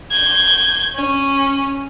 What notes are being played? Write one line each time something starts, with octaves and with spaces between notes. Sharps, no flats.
G6 G#6
C#4